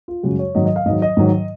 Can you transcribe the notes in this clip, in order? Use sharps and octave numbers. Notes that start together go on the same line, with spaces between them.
F4
F#2 C#3 G#3 F#4
C#5
G#2 D#3 F#3 D#5
D#5
F5
G#2 D#3 F#3 D#5
D#5
G#2 D#3 F#3